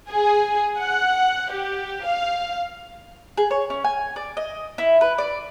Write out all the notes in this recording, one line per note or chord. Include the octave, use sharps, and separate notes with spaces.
G#4
F#5
G4
F5
G#4
C#5
C#4
G#5
D5
D#5
E4
B4
D5